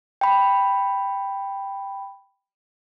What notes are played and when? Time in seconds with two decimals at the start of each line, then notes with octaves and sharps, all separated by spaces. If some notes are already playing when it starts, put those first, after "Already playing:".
0.21 G5 B5